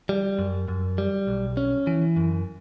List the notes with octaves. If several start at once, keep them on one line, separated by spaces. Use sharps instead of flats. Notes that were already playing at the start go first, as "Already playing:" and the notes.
G3
F#2
F#2
G3
B1
C#4
E3
F#2